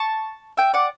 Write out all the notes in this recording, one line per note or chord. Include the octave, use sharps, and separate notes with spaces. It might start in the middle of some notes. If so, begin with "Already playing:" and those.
Already playing: A5 C#6
E5 G5
D5 F#5